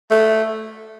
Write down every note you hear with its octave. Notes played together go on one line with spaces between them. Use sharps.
A3